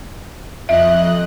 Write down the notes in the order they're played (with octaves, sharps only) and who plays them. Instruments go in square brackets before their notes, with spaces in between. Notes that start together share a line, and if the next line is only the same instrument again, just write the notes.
[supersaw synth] F2 D#5 F#6 [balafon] E5